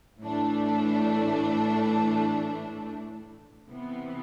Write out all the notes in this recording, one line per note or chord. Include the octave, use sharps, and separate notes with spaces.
A2 E3 A3 D4
C3 E3 B3